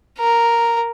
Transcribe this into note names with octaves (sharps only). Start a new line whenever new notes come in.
A#4